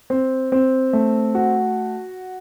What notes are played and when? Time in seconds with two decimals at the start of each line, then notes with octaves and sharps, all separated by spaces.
0.10 C4
0.52 C4
0.93 A3
1.35 F#4